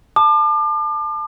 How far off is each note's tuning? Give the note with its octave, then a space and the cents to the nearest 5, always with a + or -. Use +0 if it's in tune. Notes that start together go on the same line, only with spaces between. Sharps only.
A5 +0 D6 +40